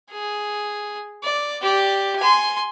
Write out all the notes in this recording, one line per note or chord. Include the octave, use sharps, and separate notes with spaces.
G#4
D5
G4 D5
G#5 C6